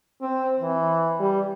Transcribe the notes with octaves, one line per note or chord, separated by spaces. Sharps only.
C4
E3
G3